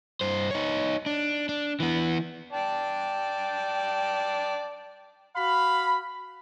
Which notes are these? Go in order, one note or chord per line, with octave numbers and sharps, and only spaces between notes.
G2 C5
D#4 C#5
D4
D4
E3 B3
D5 G5 A5
F#4 F5 B5